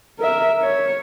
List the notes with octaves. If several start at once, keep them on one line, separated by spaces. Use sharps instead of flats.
A#4 E5
C#5